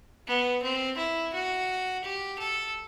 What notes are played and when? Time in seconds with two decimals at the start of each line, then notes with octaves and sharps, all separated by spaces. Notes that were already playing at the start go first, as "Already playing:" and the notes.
0.27 B3
0.62 C4
0.97 E4
1.33 F#4
2.04 G4
2.39 A4